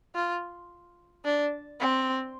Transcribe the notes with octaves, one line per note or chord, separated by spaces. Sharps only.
F4
D4
C4